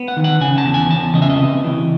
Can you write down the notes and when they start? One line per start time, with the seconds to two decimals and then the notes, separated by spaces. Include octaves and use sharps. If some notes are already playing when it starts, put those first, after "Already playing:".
Already playing: B3
0.08 F#5
0.17 D#3
0.24 F#5
0.41 C#3 G#5
0.58 A5
0.66 E2
0.74 G#5
0.90 E2 A5
1.15 C#3 D#5
1.22 E5
1.30 D#5
1.40 C3
1.64 E3